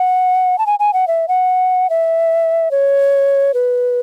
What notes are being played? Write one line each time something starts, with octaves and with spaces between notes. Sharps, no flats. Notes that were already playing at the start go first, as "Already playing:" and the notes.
Already playing: F#5
A5
G#5
G#5
F#5
E5
F#5
E5
C#5
B4